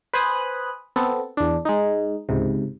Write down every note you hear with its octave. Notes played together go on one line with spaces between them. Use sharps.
B4 C5 G#5 B5 D#6 F#6
B3 C4 A4
E2 D4
G#3 D#4
C#2 G#2 C3